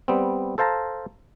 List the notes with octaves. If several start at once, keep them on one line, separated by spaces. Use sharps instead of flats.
G3 B3 C4
A4 C5 F5 A5 A#5